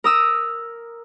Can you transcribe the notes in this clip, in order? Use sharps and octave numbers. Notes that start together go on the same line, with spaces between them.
A#4 D#6 E6